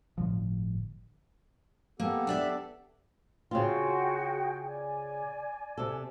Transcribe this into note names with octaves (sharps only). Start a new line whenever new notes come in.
G1 A2 D3 F3
A#3 B3 G4 A4
D4 D5 E5
C#3 C4 F4 F#4 G#4 G5
D5 G#5
C3 A4